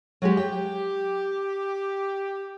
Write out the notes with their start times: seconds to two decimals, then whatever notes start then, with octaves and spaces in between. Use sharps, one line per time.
0.22 F#3 G#3 G4
0.37 G4 G5